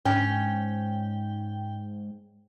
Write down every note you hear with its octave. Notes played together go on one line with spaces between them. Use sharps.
G#2 C#4 G5